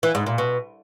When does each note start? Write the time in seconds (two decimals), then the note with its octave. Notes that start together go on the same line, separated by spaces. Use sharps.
0.03 E3
0.15 G#2
0.26 A#2
0.38 B2